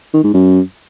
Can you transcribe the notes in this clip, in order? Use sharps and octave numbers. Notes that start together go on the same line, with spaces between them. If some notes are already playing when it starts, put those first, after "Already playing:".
D#3
G#2
F#2